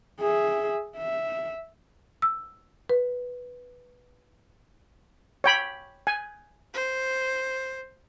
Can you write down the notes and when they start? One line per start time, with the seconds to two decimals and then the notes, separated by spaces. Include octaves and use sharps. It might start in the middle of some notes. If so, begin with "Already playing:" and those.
0.20 G#4 E5
0.97 E5
2.22 E6
2.89 B4
5.44 C#5 G5 B5
6.07 G#5
6.74 C5